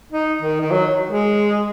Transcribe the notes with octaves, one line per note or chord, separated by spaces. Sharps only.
D#4
D#3
D#3
F#3
G#3